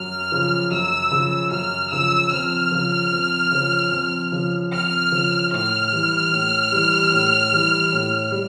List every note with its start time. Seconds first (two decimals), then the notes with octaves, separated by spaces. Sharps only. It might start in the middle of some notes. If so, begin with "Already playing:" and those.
Already playing: F#2 F6
0.32 C#3 F3
0.71 F#2 E6
1.11 C#3 F3
1.51 F#2 F6
1.92 C#3 F3 E6
2.32 F2 F6
2.71 C#3 F3
3.12 F2
3.52 C#3 F3
3.92 F2
4.32 C#3 F3
4.72 F2 F6
5.12 C#3 F3
5.52 A2 F6
5.92 E3 G3
6.32 A2
6.72 E3 G3
7.12 A2
7.52 E3 G3
7.92 A2
8.32 G3